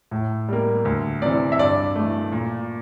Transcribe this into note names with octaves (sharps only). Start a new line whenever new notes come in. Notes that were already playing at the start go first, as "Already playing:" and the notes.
A2
G3 A#3
D2
C3 E3 D5
E5
G2 D5
A3
E3
A#2